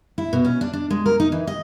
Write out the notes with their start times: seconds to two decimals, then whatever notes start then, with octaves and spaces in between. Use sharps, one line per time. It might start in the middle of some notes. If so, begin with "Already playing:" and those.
0.18 E4
0.33 B2
0.45 C#4
0.61 D4
0.73 D4
0.90 G#3
1.06 A#4
1.20 D#4
1.32 E3
1.47 D#5